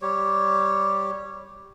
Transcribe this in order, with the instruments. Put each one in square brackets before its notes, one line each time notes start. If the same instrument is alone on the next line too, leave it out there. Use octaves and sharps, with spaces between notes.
[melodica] G3 G4 C#5